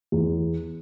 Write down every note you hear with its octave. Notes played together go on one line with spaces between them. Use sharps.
E2